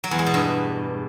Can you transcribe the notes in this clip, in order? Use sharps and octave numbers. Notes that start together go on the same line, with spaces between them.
F#3
E2
G#3
B2
G2